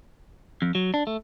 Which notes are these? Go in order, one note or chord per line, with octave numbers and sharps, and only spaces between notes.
F2
F#3
D4
A3